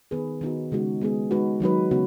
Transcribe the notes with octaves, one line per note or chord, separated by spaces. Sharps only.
D#3 B3 G#4 B4
D#3 B3 D#4 F#4
C#3 G#3 D#4 F#4
G#3 B3 G#4
G#3 D#4 F#4 B4
D#3 F#3 D#4 F#4 B4
C#3 B3 F#4